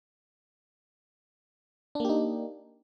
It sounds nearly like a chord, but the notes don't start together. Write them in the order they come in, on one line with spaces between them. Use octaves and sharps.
D4 A#3 G4 D#4